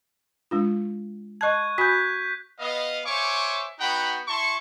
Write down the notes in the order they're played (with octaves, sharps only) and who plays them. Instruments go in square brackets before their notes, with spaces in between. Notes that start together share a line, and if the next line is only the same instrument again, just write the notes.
[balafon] G#3 D4 F4
[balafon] D#5 A5 [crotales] C#6 F#6 G#6
[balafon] F#4 G#5 B5 [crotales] G6 B6
[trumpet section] B3 D#5 F5
C5 C#5 E5 G#5 C#6 D6
B3 D#4 F#4 F#5 G5 B5
E4 A5 C6 C#6